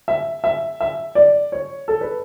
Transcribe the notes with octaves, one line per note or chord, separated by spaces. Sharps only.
E5
E5
E5
D5
C#5
A4
B4